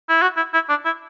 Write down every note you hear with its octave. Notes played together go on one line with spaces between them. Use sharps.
E4
F#4
E4
E4
D4
E4